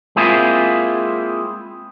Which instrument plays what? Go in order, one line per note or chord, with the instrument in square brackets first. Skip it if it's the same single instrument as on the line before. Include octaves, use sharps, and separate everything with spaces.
[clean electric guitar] G#3 A#3 C4 E4 F4 G#4